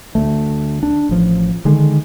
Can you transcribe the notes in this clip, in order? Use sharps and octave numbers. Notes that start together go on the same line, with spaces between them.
D2 A3
D4
A1 F3
D3 D#3 G#3